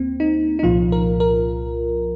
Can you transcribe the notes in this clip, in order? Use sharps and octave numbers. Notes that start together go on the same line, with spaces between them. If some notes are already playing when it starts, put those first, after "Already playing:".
Already playing: D#2 A#3 C4
D#4
D#4
C2 A#2 F3 F4
A#4
A#4